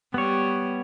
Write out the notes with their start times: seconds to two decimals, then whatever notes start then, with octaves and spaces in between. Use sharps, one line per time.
0.14 G3 B3 C#5